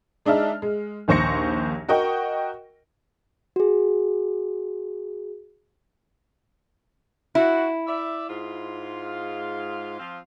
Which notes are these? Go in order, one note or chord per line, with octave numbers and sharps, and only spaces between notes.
G#3 D4 D#4 E5 A5 F6
G#3
A#1 D#2 C5 C#6 A#6 C#7
F#4 A#4 D#5 F#5 G5 C#6
F#4 G#4
E4 F#4
D5 E5
G#2 G#3 F4
F3 C4 F4